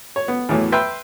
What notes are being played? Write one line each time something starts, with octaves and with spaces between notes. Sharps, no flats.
C#5
B3
E2 A2 E3 F#3
B4 E5 G5 C6